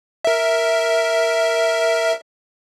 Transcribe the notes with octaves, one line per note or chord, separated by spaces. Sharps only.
A#4 E5